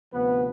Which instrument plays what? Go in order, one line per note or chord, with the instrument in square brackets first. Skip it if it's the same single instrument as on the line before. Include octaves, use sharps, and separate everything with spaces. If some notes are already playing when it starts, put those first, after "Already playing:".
[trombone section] D2 C3 F3 B3 B4